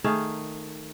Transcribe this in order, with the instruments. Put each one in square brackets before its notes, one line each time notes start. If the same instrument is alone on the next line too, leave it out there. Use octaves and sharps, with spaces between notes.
[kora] D#3 A3 G#4 F5